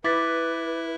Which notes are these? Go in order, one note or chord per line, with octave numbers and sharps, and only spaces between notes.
E4 B4 D6 A6 B6